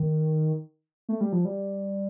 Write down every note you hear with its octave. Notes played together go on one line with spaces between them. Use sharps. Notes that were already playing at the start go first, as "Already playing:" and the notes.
Already playing: D#3
A3
G3
F3
G3